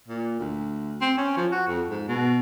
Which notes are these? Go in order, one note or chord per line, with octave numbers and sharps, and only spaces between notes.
A#2
D2
C4
C#4
F3
F#4
F2
G#2
B2